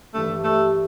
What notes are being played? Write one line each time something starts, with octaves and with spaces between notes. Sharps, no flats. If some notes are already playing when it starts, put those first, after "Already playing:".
G2 E3 G3 A3 D4
A3